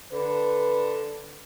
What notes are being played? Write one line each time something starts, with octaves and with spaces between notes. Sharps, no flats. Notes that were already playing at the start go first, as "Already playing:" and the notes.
D3 B4